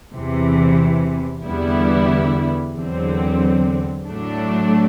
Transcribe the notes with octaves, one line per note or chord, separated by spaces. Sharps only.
E2 C3 E3
E2 D3 G3 B3 E4
E2 D3 F#3 C4
A2 F#3 A3 D4